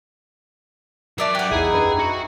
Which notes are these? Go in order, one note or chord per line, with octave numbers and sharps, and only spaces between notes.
F#3 A#4 D5 E5 A5
G4 F#5 F#6
A#1 E2 D#4 E4 G#4
F#2 D4 B4
F#4